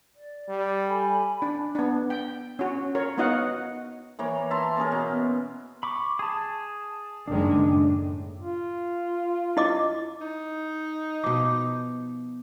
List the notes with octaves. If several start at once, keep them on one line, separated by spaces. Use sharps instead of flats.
D5
G3
A4 G#5 B5
D4
B3 D4
G5
C#4 F#4
A#4 C#5
B3 D#4 F#4 D#5 F5 F#5
E3 A#3 C#5
E5 A5 A#5 C6
A#3 C#4 G#4 A#4
B2
B5 C#6 D6
G#4 A5
F#1 D#3 G#3 D4
A2
F4
E4 D#5 D6
D#4
B2 F3 D6